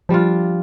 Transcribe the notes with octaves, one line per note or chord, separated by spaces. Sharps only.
F3 G3 D4 F4